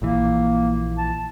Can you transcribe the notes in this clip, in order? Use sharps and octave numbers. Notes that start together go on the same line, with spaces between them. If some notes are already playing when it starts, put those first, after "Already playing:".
A#1 E3 A#3
A5